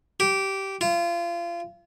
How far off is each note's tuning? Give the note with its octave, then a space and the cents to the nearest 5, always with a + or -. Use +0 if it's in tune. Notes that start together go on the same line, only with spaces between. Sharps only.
G4 -15
F4 -30